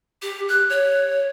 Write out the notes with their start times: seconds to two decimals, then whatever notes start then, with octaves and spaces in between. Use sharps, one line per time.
0.22 G4
0.49 F#6
0.70 C#5